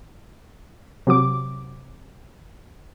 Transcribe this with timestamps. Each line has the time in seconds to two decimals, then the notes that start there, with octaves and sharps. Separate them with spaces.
1.07 C3 F#3 D6